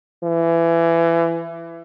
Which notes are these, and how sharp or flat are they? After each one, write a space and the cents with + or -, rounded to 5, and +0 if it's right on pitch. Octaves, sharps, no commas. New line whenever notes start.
E3 +25